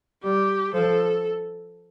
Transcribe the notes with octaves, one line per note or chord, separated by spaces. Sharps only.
G3 G4
F3 A4